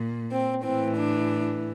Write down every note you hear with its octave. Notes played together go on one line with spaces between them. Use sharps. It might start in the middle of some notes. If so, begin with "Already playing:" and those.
Already playing: A#2
C4
A2 E3 C4
D4